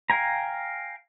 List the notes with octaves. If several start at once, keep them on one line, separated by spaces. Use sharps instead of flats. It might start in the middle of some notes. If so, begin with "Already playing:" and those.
F5 G5 G#5 A#5